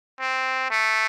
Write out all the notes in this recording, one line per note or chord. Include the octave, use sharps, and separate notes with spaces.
C4
A3